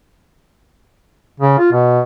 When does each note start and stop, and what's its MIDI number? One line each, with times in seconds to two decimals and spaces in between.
1.40 1.55 49
1.58 1.69 65
1.72 2.00 47